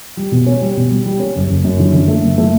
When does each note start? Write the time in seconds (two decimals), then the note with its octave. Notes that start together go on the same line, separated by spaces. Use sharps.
0.17 G3
0.32 B2
0.46 C#4
0.61 G3
0.77 B2
0.91 G3
1.06 G3
1.20 C#4
1.36 F#1
1.49 F#1
1.65 F#2
1.79 D3
1.94 D3
2.08 A3
2.23 F#1
2.38 A3